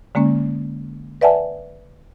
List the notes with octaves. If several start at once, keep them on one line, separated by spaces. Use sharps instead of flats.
D3 G#3 A#3 C#4
B4 D5 E5 F#5 G#5 A5